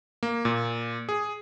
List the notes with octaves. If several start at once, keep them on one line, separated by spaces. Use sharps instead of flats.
A#3
A#2
G#4